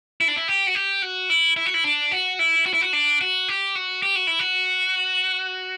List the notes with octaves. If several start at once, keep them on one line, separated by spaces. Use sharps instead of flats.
E4
D4
E4
G4
F#4
G4
F#4
E4
E4
F#4
E4
D4
F#4
E4
F#4
E4
F#4
D4
F#4
G4
F#4
G4
F#4
E4
F#4